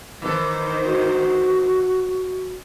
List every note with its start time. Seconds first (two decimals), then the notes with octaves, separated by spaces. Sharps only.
0.22 D#3 E3 A4 C5
0.84 F#4